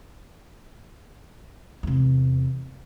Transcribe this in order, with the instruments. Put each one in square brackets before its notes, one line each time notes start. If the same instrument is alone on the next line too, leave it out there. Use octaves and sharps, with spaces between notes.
[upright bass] E2 C3